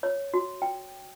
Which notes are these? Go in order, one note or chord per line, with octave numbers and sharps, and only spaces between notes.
C#5
F#4
G5